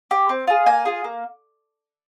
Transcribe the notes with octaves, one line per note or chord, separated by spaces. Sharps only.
G4
C4
F4 G#4
A#3 G#5
F4 G#4
A#3